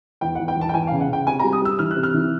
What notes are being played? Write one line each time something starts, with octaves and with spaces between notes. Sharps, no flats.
E2 G5
F#5
E2
G5
E2 A5
G5
E2 G#5
F5
C#3
F#5
C#3 G5
C3 G#5
A#5
G3
D#6
G3 E6
E3 F6
F#6
C3
F6
E3